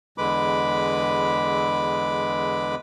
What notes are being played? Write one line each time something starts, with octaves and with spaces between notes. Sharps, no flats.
E2 D3 G#3 B4 B5 D6